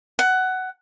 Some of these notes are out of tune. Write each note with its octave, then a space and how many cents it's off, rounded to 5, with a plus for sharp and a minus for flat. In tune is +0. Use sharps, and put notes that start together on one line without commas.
F#5 +15